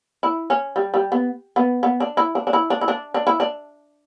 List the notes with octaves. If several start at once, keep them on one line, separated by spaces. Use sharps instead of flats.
E4
C#4
G3
G3
B3
B3
B3
D4
E4
D4
D4
E4
D4
E4
D4
D4
E4
D4